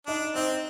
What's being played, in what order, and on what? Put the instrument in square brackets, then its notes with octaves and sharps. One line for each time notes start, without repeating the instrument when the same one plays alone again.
[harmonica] D4 [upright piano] D#4
[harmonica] C4 [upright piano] D#4